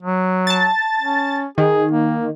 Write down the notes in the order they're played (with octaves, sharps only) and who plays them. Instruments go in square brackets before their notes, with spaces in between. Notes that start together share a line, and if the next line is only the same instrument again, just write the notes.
[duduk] F#3
[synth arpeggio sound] A5 A6
[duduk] C#4
[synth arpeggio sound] D#3 [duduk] G#4
[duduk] A#3